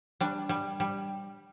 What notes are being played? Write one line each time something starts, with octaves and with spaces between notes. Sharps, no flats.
G3 D4
G3
G3